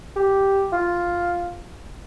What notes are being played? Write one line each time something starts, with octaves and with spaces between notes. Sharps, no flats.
G4
F4